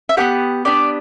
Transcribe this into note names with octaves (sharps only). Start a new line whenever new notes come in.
E5
B3 D4 G4 F#5
B3 D4 G4 D5